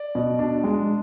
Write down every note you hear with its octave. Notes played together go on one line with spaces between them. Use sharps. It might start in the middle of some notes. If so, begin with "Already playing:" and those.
Already playing: D5
B2
D4
G#3